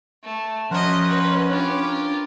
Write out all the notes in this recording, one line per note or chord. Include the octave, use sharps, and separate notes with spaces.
A3
F3 C#4 F#4 A#4 C5 D#5 F#5
B4
D4 F4 G4 B4 C#5
A#4